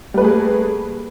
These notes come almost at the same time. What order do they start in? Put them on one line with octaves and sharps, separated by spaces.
G3 B4 A3 G#4 A#3